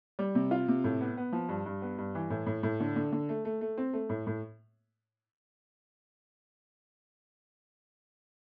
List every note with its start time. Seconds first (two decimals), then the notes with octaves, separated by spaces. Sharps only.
0.19 G3
0.35 C3
0.51 F4
0.68 C3
0.84 A2
1.01 B3
1.17 B3
1.32 F3
1.49 G2
1.66 G2
1.82 B3
1.98 G2
2.15 E3
2.30 A2
2.47 A2
2.63 A2
2.80 D3
2.96 D3
3.12 D3
3.29 A3
3.45 A3
3.61 A3
3.78 C4
3.93 A3
4.10 A2
4.27 A2